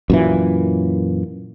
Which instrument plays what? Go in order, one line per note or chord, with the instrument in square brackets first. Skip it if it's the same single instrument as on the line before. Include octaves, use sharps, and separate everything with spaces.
[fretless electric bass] F#2 A#2 E3